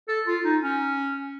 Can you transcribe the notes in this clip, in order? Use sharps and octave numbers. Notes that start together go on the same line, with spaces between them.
A4
F4
D#4
C#4